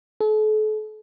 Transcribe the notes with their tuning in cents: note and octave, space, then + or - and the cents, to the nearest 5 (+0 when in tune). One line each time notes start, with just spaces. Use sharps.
A4 -40